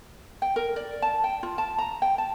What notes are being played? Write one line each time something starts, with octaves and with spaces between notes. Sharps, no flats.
G5
A#4
D5
A5
G5
F4
A5
A#5
G5
A5